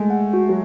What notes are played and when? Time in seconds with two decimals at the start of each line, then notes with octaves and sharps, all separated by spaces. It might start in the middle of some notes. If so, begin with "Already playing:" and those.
Already playing: G#3 A3
0.10 F#5
0.33 F#4
0.49 F#3